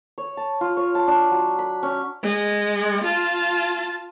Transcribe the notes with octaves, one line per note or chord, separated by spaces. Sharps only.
C#5
A5
F4
C#5
A5
D4
F#3
B5
C#4
G#3
F4 A5